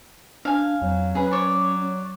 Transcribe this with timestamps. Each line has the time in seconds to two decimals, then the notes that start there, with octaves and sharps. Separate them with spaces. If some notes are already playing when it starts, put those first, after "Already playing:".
0.45 D4 F5 G#5
0.82 F2 F#3
1.15 C#4 G#4 B4
1.31 C#5 D5